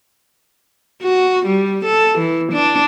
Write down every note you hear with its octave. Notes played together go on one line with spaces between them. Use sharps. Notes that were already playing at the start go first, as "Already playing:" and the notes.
F#4
G3
A4
E3
D4